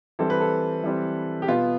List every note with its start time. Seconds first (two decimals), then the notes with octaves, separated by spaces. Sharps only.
0.19 E3 G3 C4 A4
0.30 B4
0.40 A4
0.83 E3 G3 C4
1.42 G4
1.48 B2 B3 F4